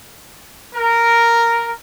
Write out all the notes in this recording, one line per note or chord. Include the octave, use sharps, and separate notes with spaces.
A#4